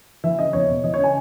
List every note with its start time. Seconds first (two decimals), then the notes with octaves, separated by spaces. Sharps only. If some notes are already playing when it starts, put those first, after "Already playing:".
0.24 E3 E5
0.39 C#3 D#5
0.53 E2 C#5
0.68 E1
0.84 E3 D#5
0.94 C#3 C#5
1.04 G#5